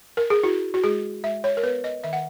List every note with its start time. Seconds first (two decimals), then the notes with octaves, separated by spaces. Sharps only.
0.17 A#4
0.30 G#4
0.43 E4 F#4
0.74 F#4
0.84 G#3 G#4
1.24 G#3 E5
1.44 C#5
1.57 A#4
1.63 B3 B4
1.84 D#5
2.04 D#3 E5
2.13 F#5